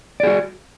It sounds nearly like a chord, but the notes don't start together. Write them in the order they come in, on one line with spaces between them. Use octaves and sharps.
D5 G#4 F#4